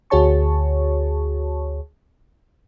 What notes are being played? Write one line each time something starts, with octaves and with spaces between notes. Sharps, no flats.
D2 F#4 G#4 C#5 A5 C#6